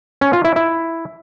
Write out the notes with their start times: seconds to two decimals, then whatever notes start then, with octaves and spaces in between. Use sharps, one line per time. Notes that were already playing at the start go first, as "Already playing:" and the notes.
0.21 C#4
0.33 F4
0.44 E4
0.56 E4